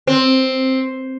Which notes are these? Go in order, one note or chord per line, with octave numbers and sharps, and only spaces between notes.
C4